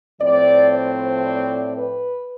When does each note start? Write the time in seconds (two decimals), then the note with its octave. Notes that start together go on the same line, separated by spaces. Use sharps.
0.19 A2 F3 C4 D5
0.71 C5
1.24 D5
1.75 B4